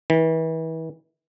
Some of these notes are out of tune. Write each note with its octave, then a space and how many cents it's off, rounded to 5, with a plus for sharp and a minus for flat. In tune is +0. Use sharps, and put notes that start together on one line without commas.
E3 -35